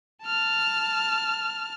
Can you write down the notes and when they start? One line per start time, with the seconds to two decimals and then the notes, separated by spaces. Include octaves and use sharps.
0.25 A5 F6